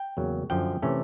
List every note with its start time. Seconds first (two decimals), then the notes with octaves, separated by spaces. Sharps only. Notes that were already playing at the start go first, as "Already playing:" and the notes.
Already playing: G5
0.17 E2 C#3 F#3 A#3
0.50 F#2 D3 F3 G5
0.82 C3 E3 A3 C#4